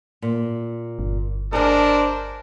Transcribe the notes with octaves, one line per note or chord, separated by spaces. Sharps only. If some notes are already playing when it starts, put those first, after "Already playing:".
A#2
G1
D4 G#4 A#4 C5 D#5